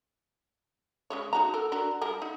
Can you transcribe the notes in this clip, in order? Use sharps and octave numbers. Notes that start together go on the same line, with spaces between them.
C#3 G#3 C#5
D#4 F#4 A#5
A4 A#4
D4 F#4 A#4
G3 A#4 F#5
D#4